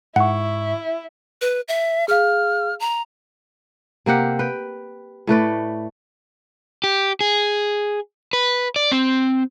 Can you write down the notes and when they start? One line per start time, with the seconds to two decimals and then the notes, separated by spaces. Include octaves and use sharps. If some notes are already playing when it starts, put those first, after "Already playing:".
0.16 G#2 E4 F#5 C#6
1.41 B4
1.68 E5
2.08 G#4 F5 F6
2.80 A#5
4.06 C3 A#3 G4 F#5
4.39 B4 G5
5.27 A2 A3 B4 D5
6.84 G4
7.21 G#4
8.33 B4
8.76 D5
8.92 C4